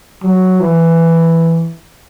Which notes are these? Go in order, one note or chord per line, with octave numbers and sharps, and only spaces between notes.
F#3
E3